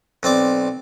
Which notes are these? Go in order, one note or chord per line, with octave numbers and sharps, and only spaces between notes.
B1 C4 D5 D6